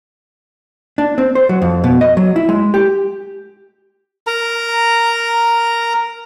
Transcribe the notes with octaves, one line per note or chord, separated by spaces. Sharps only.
D4
C4
C5
F#3
F2
B2
D#5
F#3
E4
G#3
G4
A#4 A#5